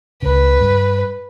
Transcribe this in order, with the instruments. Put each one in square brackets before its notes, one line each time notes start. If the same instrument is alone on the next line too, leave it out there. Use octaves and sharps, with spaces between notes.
[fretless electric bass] C#2 C#3 [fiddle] B4
[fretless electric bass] G2